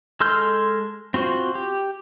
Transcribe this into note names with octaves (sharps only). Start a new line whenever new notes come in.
G#3 A4 C6 F6 G6
C4 F4 F#4 C5
G4